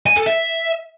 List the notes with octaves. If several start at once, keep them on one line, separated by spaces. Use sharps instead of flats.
G#5
A4
E5